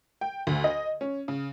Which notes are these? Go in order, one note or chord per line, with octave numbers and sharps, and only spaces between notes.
G5
D2
D#5
C#4
C#3